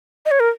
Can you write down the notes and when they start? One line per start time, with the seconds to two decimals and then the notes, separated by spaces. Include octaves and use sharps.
0.26 D#5
0.31 C#5
0.40 A#4